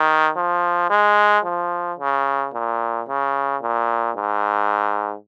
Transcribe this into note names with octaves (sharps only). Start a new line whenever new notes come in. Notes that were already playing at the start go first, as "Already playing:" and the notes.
Already playing: D#3
F3
G#3
F3
C#3
A#2
C#3
A#2
G#2